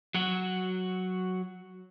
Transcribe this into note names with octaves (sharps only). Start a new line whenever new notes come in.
F#3 F#4